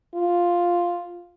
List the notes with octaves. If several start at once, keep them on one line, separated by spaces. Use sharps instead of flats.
F4